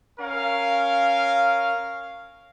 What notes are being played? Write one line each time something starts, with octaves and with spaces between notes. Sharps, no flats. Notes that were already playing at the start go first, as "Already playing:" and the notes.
C#4 A#4 F5